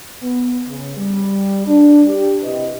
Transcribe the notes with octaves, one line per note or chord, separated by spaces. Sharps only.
B3
C#3
G3
D4
G4
C3 E4 G4 B4 D#5